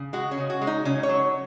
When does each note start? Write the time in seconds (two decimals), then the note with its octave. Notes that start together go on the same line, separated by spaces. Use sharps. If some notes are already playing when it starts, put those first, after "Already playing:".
Already playing: C#3
0.13 G#3 F#4
0.31 C#4
0.38 C#3
0.50 F#4
0.62 G#3
0.67 D#4
0.85 C#3 C#4
1.03 C#5
1.09 F#3